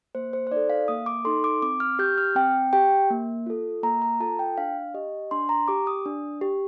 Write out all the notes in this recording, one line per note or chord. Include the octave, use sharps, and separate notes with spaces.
A#3 C5
C5
C5
D#4 A4 D5
F5
A#3 D#6
D6
D#4 A4 C6
D6
C4 D6
F6
G4 G6
F6
C4 G5
G4 G5
A#3
F4 A4
A#3 A#5
A#5
F4 A4 A5
G5
D4 F5
G4 D#5
D4 C6
A#5
G4 D6
D#6
D4
G4